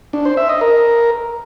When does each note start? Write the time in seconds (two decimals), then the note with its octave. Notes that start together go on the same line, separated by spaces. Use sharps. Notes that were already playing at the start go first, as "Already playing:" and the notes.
0.13 D4
0.25 C5
0.37 E5
0.49 D#5
0.61 A#4